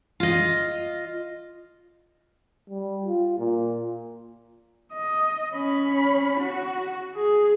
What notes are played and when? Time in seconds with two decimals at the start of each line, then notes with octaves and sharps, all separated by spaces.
0.20 F4 D#5
2.69 G3
3.05 F4
3.39 A#2
4.93 D#5
5.55 C#4 B5
6.40 F#4
7.14 G#4